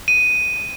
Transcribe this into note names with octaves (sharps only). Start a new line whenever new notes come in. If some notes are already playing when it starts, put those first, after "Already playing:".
D#7